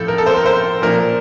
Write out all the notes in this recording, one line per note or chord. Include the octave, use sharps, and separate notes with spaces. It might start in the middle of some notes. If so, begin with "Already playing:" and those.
Already playing: A2 F3 A4
A#4
A4
C5
A#4
C5
A#2 F3 A#4